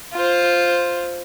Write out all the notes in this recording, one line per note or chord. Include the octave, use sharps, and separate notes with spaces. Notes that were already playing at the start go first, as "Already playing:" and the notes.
F4 C5